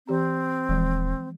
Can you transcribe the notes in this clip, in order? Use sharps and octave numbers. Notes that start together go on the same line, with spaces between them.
E3 C4 G4 A#5
D#1 E3 F3 G#3